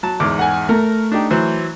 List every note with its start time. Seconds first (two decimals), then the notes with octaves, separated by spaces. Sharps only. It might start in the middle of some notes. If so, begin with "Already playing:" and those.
0.03 F#3 A5
0.20 E2 G#2 D6
0.39 F#5 G#5
0.69 A3 A#4
1.12 D4 D#4 G4
1.31 E3 F#3 C5